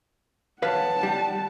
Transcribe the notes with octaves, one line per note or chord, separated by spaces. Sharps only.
B4 C#5 F5 F#5 A5
G3